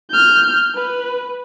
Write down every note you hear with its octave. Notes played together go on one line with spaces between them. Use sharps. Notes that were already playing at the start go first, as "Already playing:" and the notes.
F6 G6
B4